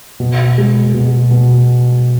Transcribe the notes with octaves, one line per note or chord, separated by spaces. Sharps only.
B2
G#3
B2
B2